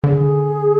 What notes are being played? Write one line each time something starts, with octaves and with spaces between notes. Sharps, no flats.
D3 G#4